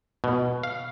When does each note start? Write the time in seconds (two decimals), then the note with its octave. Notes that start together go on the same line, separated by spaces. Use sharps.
0.24 B2
0.63 F5